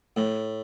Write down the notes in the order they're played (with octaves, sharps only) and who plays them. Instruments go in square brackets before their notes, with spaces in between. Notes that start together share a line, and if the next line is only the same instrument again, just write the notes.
[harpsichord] A2 [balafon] A3